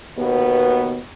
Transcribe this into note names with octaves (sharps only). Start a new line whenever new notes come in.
D#2 B2 B3